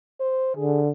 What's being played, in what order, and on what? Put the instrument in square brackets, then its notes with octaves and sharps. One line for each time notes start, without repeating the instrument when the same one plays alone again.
[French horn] C5
[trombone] D3 [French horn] G#4